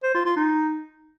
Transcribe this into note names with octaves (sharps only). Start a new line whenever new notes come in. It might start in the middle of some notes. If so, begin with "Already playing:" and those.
C5
F4
F4
D#4